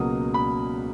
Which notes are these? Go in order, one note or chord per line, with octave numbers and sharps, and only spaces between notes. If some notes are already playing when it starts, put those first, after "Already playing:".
Already playing: C#2 B2 F#3 A#3 D#6
B5